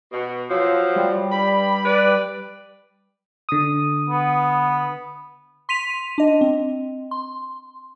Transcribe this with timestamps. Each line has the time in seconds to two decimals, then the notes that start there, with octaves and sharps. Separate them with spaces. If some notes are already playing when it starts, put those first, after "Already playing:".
0.12 B2
0.50 F3 F#3
0.96 G3
1.30 G2 G4 B5
1.85 B4 D5
3.49 D3 D#6
4.09 B3
5.69 C6 B6 D#7 F7
6.18 D4 D#5
6.41 C4
7.11 C6